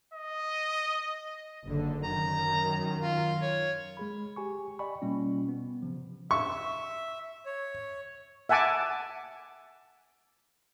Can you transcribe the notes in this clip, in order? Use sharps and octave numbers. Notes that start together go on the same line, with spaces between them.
D#5
F#1 D3
F#2 D#3 A#5
F4
C#5
G#3 G#4 B5
G4 G#5 C#6
D5 D#5 G5 G#5 B5 C#6
B2 G3 A#3 C#4 F4
B3
C3 F3
E5 C#6
C#5
E5 F#5 G#5 A5 D6